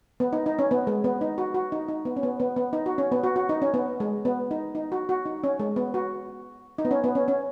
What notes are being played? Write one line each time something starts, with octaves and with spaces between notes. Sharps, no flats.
B3
D#4
D#4
C#4
B3
G#3
B3
D#4
F#4
F#4
D#4
D#4
B3
C#4
B3
B3
B3
D#4
F#4
C#4
B3
F#4
F#4
D#4
C#4
B3
G#3
B3
D#4
D#4
F#4
F#4
D#4
C#4
G#3
B3
F#4
D#4
B3
C#4
B3
C#4
C#4